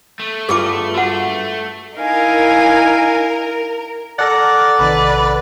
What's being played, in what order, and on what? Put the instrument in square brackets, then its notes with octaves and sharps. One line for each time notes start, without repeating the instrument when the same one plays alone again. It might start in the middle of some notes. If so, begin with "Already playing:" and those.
[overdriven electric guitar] A3
[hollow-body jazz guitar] G2 B3 F4 [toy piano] G#4 D6
[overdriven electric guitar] A3 [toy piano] F#4 F#5
[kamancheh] D#4 G#5 [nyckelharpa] E4 F5 [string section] A#4
[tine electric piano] A4 F#5 [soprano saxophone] D5 [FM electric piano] A#5 F6 A#6
[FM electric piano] A#1 C3 D#3 [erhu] B4